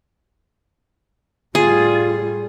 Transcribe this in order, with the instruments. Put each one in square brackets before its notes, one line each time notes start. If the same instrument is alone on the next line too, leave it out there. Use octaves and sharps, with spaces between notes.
[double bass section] A2 G3 [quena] F4 [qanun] G#4